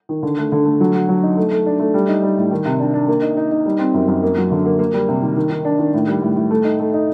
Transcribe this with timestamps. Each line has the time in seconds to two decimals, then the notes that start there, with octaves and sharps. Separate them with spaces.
0.09 D#3
0.23 D3
0.38 A3
0.52 D3
0.66 A3
0.80 F#3
0.94 F#4
1.09 F#3
1.23 D#4
1.37 A3
1.51 A3
1.66 D4
1.80 A3
1.94 G3
2.09 D#4
2.22 G3
2.38 A2
2.51 D#3
2.65 C3
2.79 D4
2.93 D4
3.08 A#3
3.22 D#4
3.37 D#4
3.51 D#4
3.66 G3
3.79 C4
3.94 F#2
4.08 F#2
4.23 A#3
4.37 F#3
4.51 D3
4.65 A#3
4.79 A#3
4.94 G3
5.08 C3
5.22 D#3
5.36 D#3
5.50 D#3
5.65 D4
5.79 D#3
5.94 A2
6.07 G3
6.22 A2
6.36 A2
6.51 A3
6.64 D#4
6.79 A3
6.94 D#4